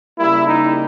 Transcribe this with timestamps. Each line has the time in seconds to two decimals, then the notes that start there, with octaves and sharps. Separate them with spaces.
0.19 C#3 G3 A#3 E4
0.48 D#4